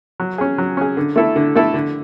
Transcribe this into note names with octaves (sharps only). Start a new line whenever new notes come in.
F#3
C#4 G#4
F#3
C#4 G#4
D3
A3 E4 A4
D3
A3 E4 A4
D3